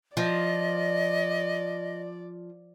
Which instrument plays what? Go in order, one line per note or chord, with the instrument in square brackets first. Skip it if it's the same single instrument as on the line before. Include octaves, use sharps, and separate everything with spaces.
[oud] F3 [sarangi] D5 [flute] D#5